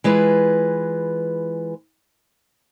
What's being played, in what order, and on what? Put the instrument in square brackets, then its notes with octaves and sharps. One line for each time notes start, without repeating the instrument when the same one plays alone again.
[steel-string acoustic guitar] E3 G#3 F4 B4